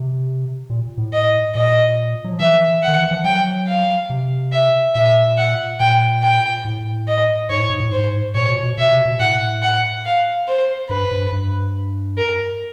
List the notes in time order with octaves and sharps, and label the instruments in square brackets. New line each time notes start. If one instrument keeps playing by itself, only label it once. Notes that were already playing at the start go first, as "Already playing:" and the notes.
Already playing: [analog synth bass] C3
A#2
A2
[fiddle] D#5
[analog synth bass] A#2 [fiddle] D#5
[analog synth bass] F#3
F3
[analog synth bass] E3 [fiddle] E5
[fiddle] F#5
[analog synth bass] D#3
E3
F3
[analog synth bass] F#3 [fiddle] G5
[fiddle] F5
[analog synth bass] C3
[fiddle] E5
[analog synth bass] A#2 [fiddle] E5
[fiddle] F#5
[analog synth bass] A#2 [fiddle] G5
[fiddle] G5
[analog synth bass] A2
[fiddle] D#5
[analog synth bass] G#2 [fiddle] C#5
[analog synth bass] A2
G#2
A2
[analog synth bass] G#2 [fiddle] C5
[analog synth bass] A#2 [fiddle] C#5
[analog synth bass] B2
B2
[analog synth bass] B2 [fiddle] E5
[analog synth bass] C3
B2
[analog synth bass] A2 [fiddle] F#5
[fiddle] F#5
F5
C5
[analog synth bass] G2 [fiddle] B4
[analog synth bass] G2
G2
[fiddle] A#4